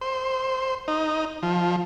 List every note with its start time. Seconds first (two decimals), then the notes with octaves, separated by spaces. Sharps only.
0.01 C5
0.88 D#4
1.43 F3